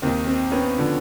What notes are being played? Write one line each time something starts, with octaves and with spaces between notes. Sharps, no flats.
D#2 D#3 C4
C4
B3 C#4
D3 F3